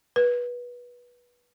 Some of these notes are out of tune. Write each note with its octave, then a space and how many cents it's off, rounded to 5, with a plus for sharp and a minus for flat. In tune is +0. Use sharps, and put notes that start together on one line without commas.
B4 -20